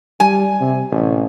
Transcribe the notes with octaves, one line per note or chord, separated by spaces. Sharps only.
G3 G#5
C3
A1